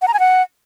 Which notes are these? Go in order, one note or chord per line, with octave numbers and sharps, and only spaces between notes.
F#5
A#5
G#5
F#5